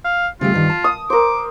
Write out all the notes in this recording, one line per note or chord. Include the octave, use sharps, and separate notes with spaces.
F5
C#3 G3 A3 F4
G2 D#3
A5
D#6
A#4 C5 D6